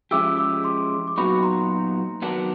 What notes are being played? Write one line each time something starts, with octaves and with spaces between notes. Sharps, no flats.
F3 G#3 C#4 E4 G4 D6 E6
D6 E6
C6 D6
D6
A#2 F#3 B3 D#4 F#4 B5 C#6
A#5 C6
D#3 F#3 B3 D4